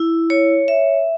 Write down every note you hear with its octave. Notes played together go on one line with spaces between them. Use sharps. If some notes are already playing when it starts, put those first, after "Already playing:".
Already playing: E4
C#5
E5